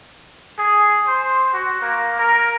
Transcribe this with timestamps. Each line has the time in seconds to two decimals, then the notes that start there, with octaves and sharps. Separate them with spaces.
0.58 G#4
1.07 C5
1.53 F#4
1.81 A#3
2.19 A#4